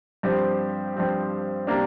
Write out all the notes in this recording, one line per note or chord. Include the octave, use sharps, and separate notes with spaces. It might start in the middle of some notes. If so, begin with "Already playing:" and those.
G2 F3 C4 G4
G2 F3 C4 G4
C3 G3 A#3 D4